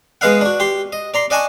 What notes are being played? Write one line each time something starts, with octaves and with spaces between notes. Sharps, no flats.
G#3 B3 B4 D#5 F5 F#5
D4 F#4
G4 C6
D#5
D5 A#5 C6
D5 D#5 F#5 G#5 A5 C#6